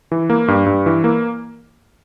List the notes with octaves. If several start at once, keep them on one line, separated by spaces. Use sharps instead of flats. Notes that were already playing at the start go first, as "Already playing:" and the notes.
E3
A#3
G2
G2
E3
A#3